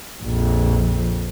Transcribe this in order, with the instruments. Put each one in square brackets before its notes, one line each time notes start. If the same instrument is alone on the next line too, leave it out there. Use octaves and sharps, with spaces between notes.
[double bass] A#1 F2